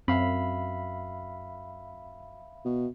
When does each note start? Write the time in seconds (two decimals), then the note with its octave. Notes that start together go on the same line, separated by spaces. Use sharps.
0.08 F#2 C4 E5 F5 B5
2.65 B2